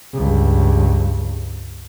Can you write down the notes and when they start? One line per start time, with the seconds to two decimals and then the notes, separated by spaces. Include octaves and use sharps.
0.14 C#2 G2